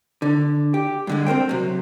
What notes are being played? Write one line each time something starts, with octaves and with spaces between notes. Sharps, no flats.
D3
G4
G2 D3 G#3
C4 A#4 C5 G5
C3 F#3